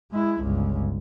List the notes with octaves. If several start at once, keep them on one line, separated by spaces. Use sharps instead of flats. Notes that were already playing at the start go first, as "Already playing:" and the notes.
G#3 E4
G1 C#2